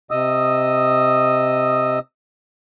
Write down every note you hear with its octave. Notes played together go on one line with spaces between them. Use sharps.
C3 D#5 D#6 E6